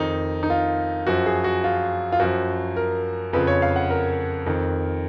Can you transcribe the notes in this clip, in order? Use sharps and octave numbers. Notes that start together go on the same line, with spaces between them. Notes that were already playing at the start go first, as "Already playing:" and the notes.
Already playing: F2 D#3 D#4
D#4
F4
F#2 F3 F#4
G#4
F#4
F4
F4
F#2 F3 F#4
A#4
F2 C#3 F3 B4
C#5
F5
F#5
A#4
F2 D#3